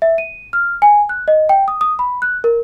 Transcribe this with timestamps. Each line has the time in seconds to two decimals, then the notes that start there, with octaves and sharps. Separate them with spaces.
0.02 E5
0.18 D#7
0.53 F6
0.82 G#5
1.09 F#6
1.28 D#5
1.49 G5
1.68 D#6
1.81 D#6
1.99 B5
2.22 F#6
2.44 A#4